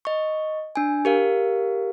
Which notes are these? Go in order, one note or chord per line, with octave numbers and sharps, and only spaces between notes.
D#5 C#6
D4 G#5
G4 A#4 F5